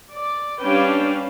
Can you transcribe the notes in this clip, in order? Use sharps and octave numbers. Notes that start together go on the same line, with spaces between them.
D5
G3 C#4 D4 B4 F5 G5